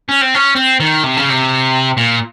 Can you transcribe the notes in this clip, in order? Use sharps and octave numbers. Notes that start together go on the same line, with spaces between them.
C#4
C4
C#4
C4
D#3
C3
C#3
C3
A#2